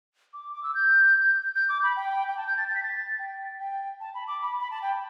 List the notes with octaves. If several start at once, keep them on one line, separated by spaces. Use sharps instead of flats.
D6
D6
E6
G6
G6
D6
B5
G5
G5
A5
G6
A6
A6
B6
A6
G5
G5
A5
B5
D6
B5
B5
A5
G5